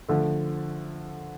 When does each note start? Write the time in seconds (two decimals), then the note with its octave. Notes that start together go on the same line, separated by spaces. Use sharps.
0.08 D3 F3 A3